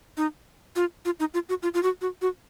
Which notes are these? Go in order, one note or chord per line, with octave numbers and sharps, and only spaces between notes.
D#4
F4
F4
D#4
F4
F#4
F4
F4
F#4
F#4
F#4